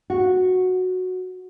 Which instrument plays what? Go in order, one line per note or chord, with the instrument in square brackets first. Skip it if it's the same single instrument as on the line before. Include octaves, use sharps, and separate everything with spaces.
[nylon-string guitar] F#4